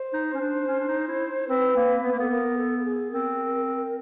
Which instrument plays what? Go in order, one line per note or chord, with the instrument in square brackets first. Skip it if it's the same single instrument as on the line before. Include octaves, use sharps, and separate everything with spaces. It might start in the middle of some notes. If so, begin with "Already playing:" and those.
Already playing: [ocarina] C5
[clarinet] D#4
C#4
D4
C#4
D4
D#4
E4
[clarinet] C4 [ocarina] B4
[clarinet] A#3
B3
A#3
[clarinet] B3 [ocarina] A4
[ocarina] A#4
A4
A4
G#4
[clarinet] C4 [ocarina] A#4